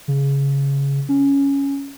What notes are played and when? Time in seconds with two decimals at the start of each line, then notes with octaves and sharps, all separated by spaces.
0.08 C#3
1.09 C#4